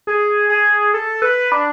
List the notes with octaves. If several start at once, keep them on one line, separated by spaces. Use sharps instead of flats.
G#4
G#4
A4
B4
D4